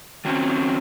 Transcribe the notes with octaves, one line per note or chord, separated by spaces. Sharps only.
D#3 F#3 C4 C#4